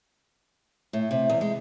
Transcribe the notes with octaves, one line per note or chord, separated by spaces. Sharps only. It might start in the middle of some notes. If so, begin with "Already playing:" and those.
A2
C3
E2
G#3